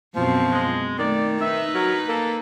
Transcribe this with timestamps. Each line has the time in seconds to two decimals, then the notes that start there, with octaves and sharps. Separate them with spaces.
0.16 F#2 B2 F3 C4
0.52 G#3
0.99 D#3 A3 D5
1.41 D#4 B4 E5
1.74 F#3 A#4
2.08 A#3 A4